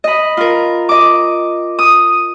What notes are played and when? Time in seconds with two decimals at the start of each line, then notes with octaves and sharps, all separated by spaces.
0.04 D#5 B5
0.37 F4 A#4
0.89 D#5 D6
1.79 D#6